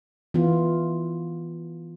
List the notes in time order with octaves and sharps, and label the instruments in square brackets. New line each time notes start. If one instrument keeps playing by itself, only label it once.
[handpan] E3 B3 F4